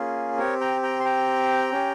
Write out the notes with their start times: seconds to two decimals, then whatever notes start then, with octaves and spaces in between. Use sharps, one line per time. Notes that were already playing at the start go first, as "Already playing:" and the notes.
Already playing: A#3 C#4 F4 G#4
0.38 C4 G4 A#4 C#5
0.60 G5 A#5
0.83 G5 A#5
1.00 C6
1.05 G5 A#5
1.72 C#4 G4